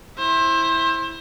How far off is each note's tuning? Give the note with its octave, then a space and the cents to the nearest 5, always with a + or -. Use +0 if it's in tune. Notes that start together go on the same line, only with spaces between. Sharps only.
E4 +0 C5 +25